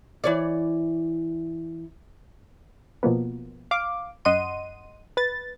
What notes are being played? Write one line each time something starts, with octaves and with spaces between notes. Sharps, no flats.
E3 C#5 D5
B2 F3 A#3 B3
F5 D6
F#2 D#5 F#5 C6 D#7
B4 A6